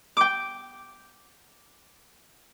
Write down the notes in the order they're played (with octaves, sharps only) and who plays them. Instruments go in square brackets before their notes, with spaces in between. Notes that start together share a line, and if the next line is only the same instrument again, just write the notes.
[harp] G5 D6